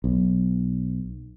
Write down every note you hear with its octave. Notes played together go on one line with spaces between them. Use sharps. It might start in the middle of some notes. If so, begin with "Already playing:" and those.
B1